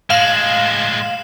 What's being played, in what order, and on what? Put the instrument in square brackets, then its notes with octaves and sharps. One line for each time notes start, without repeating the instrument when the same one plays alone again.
[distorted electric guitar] A2 G#3 [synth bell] F5 E7 F#7